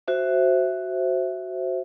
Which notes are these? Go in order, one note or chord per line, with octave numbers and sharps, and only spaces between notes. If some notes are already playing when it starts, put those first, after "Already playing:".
F#4 C5 E5